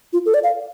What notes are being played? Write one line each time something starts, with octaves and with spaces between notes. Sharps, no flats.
F4
A4
D5
F5